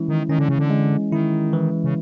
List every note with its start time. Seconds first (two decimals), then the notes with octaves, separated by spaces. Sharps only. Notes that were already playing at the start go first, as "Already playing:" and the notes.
Already playing: E3 G#3 C#4 E4
0.09 D#3
0.29 D#3 C#4
0.39 D3
0.49 C#3
0.59 D3
0.70 G#3
1.12 D#3 E4
1.53 E3
1.84 C#3